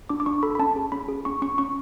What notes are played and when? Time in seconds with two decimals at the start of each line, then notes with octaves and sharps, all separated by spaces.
0.09 D4 D6
0.20 D6
0.26 D4 C#6
0.43 A4 B5
0.55 B5
0.59 C#4 A5
0.76 G#4
0.92 C#4 B5
1.08 G#4
1.25 C#4 C#6
1.42 C#4 C#6
1.58 C#4 C#6